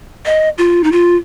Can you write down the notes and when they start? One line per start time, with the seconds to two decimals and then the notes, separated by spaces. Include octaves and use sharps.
0.26 D#5
0.58 F4
0.84 D#4
0.92 F4